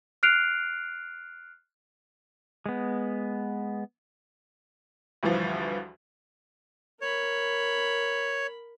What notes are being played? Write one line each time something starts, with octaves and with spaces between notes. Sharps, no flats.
F6 F#6 C7 D7 F7
G#3 B3
D2 G2 E3 F3
A#4 C#5 B5